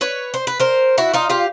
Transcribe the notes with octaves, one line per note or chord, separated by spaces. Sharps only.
B4 C#5
C5
B4
A#4 C5
E4 F#4
D#4 F4
F4 G4